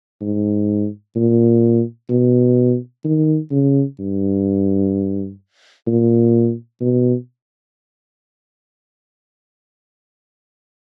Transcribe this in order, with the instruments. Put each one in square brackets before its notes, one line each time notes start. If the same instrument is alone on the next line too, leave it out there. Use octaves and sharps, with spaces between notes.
[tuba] G#2
A#2
B2
D#3
C#3
G2
A#2
B2